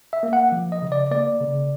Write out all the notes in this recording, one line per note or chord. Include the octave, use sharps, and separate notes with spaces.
E5
A#3
F#5
F3
D#5
C#3
D5
A#3 D5
C#3